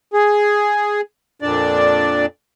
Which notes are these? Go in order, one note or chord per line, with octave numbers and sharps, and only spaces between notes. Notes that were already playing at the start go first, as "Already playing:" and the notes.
G#4
F2 A#2 D4 D5